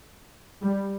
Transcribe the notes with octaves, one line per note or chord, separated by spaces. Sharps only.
G3